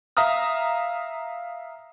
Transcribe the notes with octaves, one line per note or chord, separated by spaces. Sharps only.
E5 F5 A#5 D#6 F6